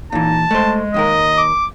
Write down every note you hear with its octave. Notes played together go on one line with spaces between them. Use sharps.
A#2 E3 D#4 A5
G#3 A3 C5
D#2 D#3 A#4 D#5
D6